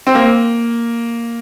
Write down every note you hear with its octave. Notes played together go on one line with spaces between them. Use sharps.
C4
A#3